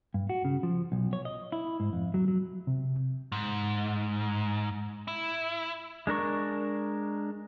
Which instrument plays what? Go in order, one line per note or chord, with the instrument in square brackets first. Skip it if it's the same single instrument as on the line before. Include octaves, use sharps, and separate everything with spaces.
[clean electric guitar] G2
F#4
C#3
F3
B1
C#5
D#5
E4
G#2
F2
F#3
F#3
[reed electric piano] C3
[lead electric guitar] G#2
E4
[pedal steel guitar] G#3 D4 A#4 C#6